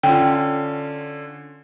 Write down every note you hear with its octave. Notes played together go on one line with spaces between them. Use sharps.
D3 C#4 F4 G5